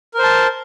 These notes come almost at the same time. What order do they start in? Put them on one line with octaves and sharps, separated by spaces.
A#4 C5 A5